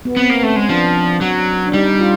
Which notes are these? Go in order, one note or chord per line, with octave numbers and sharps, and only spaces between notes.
B3
B3 C4
A#3
A3 C#4
G#3
F3 D4
F#3
D4
G3 D#4
F4